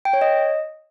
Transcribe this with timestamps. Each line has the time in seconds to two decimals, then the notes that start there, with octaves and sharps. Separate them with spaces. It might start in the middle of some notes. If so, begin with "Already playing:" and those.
0.05 G5
0.13 C#5
0.21 D#5